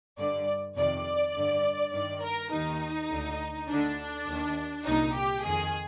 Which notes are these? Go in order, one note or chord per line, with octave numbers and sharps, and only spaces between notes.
G2 D3 D5
F2 C3 D#3 D5
G2 D3
G2 D#3 D5
A#4
D#2 D#3 D#4
D2 D3
D2 D3 D4
D#2 D#3
C2 A#2 D#4
G4
F2 D#3 G#4